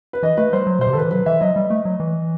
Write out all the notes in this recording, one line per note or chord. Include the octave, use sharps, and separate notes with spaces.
B4
E3 D#5
A3 B4
G3 C5
F#3
B2 C5
C3
D#3 A4 B4
E3
F#3 B4
E3 E5
F#3 D#5
G3
A3
F#3
E3